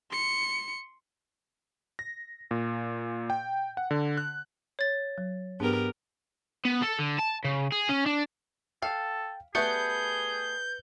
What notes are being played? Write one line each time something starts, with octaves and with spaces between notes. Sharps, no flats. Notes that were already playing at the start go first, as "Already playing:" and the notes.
C6 C#7
A#6
A#2
G5
F#5
D3
F#6
C#5 A6
F#3
G#2 B3 D4 G4 G#4 A#4
B3
A4
D3
A5
C#3
G#4
C#4
D4
A4 F5 G5
G3 A3 B3 G#4 B4 G6 C#7